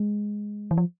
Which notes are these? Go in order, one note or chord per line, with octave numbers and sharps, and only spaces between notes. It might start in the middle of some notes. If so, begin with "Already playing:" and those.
Already playing: G#3
E3
F3